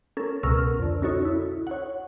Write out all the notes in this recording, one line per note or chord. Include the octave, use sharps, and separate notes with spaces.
C#4 A4 A#4
C#2 B2 A#4 C#6 E6 F6
F2 D3
C#4 D#4 F#4 A4 C#5
E4
C#5 F#5